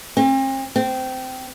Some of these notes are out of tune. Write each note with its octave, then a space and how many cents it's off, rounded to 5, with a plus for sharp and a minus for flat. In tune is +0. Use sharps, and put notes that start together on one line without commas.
C4 +40
C4 -20